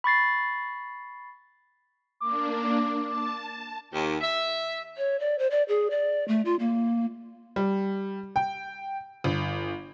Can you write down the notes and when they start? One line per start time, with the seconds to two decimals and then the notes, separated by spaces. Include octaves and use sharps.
0.04 B5 C#6 A6 C7
2.20 A#3 D4 D6
3.06 A5
3.92 D#2
4.21 E5
4.97 C#5
5.20 D5
5.39 C5
5.51 D5
5.68 G#4
5.91 D5
6.28 A3
6.45 F4
6.60 A#3
7.56 G3
8.36 G5
9.24 G1